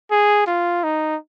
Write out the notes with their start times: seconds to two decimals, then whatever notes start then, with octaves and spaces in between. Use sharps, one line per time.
0.11 G#4
0.47 F4
0.84 D#4